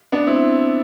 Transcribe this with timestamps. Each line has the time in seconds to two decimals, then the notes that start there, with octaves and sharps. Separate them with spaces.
0.12 B3 D4
0.27 C4 E4